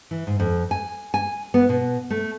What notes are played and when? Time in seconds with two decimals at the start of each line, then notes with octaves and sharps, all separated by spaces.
0.11 E3
0.27 G#2
0.40 F2
0.71 G#5
1.14 G#5
1.54 B3
1.69 B2
2.10 A3